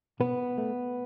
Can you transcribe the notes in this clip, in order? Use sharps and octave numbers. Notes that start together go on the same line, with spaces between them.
B2 B3 B4
A3